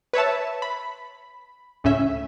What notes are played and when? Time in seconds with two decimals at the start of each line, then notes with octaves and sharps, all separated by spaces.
0.13 B4 C#5 E5 A5
0.62 B5
1.84 C#2 A2 C#4 E5